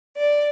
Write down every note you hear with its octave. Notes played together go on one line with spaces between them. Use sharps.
D5